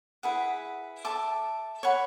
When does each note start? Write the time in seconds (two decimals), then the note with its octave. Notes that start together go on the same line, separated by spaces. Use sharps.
0.23 E4 G#4 B4 F#5
1.05 A4 E5 A5 D6
1.83 C#5 F#5 B5